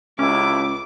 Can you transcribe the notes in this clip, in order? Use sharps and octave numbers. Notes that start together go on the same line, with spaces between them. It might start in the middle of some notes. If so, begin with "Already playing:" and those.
C#2 A2 C3 C#4 E4 D6